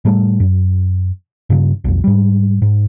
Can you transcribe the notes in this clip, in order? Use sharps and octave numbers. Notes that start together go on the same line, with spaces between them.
A2 G3 A3
F#2
G2 C#3
B1 F2
G#2 G3
G#2